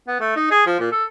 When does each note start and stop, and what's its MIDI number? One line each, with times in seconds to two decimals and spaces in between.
0.08 0.16 59
0.20 0.33 57
0.36 0.50 63
0.51 0.62 68
0.66 0.76 53
0.80 0.90 46
0.91 1.04 69